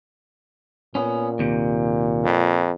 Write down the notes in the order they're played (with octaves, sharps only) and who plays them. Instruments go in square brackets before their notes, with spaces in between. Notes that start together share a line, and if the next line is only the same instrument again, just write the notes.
[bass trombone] A#2 [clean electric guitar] B3 C#4
[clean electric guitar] D#2 C3
[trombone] F2